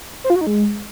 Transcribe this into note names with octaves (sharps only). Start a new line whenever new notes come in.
C5
F4
F#4
D#4
G#3